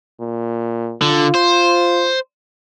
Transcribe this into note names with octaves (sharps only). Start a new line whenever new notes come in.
A#2
D3 F4
C5